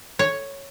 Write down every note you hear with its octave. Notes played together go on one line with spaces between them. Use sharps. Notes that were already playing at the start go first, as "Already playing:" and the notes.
C#5